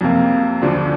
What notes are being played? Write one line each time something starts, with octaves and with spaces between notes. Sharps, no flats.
F2 C3 A#3
D2 D3 F3 D4